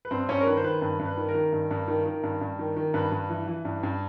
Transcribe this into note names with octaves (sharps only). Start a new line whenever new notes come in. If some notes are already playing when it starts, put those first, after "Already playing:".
B4
G2 C4 C5
G2 C#4 C#5
A#4
D#3 B4
C5
D#3 B4
G2 B4
G2
B4
D#3
A#4
D#3
G2
G2
D#3
D#3
G2
G2
D#3
D#3
G2 B4
G2
E3
E3
G2
G2